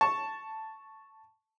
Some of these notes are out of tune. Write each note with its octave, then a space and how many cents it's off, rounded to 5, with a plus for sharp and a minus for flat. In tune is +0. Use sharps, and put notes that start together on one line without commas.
A5 +0 C#6 +0